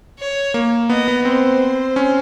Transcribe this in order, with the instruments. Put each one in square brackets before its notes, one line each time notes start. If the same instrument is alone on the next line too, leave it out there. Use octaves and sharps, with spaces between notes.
[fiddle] C#5
[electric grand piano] A#3
[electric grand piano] B3 [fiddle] D#5
[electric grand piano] B3
[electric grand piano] C4 [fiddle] C5
[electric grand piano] C#4